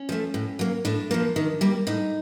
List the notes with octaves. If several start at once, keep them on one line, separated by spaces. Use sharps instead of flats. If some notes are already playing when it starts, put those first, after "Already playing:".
Already playing: C#4
F3 A3
A2
F#3 A#3
A2 D4
F3 A#3
D#3
G3 A#3
A2 D#4